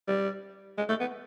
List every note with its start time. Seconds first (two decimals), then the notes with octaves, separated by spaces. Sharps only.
0.08 G3
0.78 G#3
0.89 A3
1.00 B3